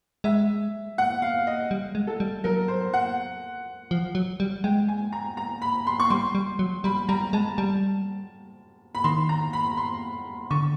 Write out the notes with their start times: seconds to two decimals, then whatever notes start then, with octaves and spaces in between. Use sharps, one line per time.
0.24 G#3 E5
0.98 F#5
1.22 F5
1.47 D#5
1.71 G3
1.95 G#3
2.07 A4
2.20 G3
2.44 F#3 A#4
2.68 C5
2.94 F#5
3.91 F3
4.15 F#3
4.40 G3
4.64 G#3 G5
4.88 G#5
5.12 A#5
5.37 A#5
5.62 B5
5.87 C6
6.00 C#6
6.10 G3 C6
6.35 G3
6.59 F#3
6.84 G3 B5
7.09 G3 A#5
7.33 G#3 A5
7.58 G3 A5
8.95 B5
9.04 D#3 C6
9.29 A#5
9.53 B5
9.77 C6
10.51 D3 C#6